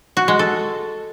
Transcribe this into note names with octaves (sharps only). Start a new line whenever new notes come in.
F#4
G#3
A4